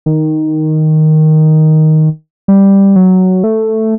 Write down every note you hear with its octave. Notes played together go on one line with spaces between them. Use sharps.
D#3
G3
F#3
A3